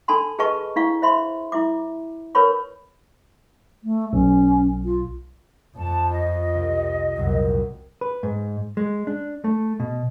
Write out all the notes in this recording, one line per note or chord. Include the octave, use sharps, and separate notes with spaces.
D4 A4 G#5 A5 B5 C6
G#4 B4 D#5 A5 C#6
D4 E4 F5 C#6
C5 E5 B5 C6
E4 E5 D6
A#4 B4 C#5 B5 C#6
A3
B1 C#4
F4
F2 A5
F4 D#5
C2 C4
C2 F2 A#2 F#3
B4
G#2
G#3
D4
A3
B2